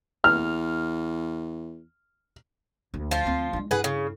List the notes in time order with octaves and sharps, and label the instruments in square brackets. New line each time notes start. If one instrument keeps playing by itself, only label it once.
[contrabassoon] E2 [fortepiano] F6
[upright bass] D2
[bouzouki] F3 F4
[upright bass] D2 C4
G#3 D4
[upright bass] G2 E4 [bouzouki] G#4 B4 F#5
[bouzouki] C#3